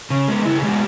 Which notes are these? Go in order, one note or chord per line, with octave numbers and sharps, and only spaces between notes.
C#3
G#3 B3
C#3 E4
G#4
G#3 B3 G4